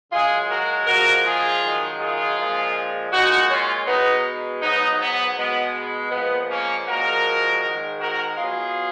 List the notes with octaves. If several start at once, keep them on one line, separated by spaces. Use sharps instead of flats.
F#2 C#3 G#3 F4 G#4
F#4 A#4
A#2 F3 G#3 F#4 A#4
F4 G#4
F#2 D#3 G#3
F4 G#4
A#2 F3 G#3
A#2 G#3 D#4 F#4
C#4 F4
B2 G#3 B3 D#4
G#2 F#3 B3 D#4
B3
B2 G#3 B3
A#2 F3 G#3 B3
A#3 C#4
A#2 F3 G#3 F#4 A#4
G#2 D#3 G#3
F#4 A#4
B2 F#3 F4 G#4